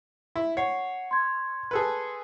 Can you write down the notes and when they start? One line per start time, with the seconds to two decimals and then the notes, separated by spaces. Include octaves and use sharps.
0.36 E4
0.57 C#5 F#5 C7
1.11 C6 G#6
1.71 G#4 A4 B4